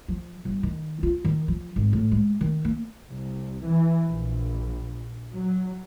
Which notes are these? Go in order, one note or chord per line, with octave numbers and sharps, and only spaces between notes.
F3
G1
D#3
F4
D#3
F3
G#1
A2
G#3
D#3
A#3
C2
E3
A#1
F#3